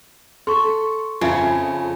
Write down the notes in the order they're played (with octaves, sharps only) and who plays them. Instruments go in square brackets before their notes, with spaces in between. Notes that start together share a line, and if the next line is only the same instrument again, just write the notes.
[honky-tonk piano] A4 [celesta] C6 C#6
[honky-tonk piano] F2 B5 G#6 [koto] C#3 [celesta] F4 E5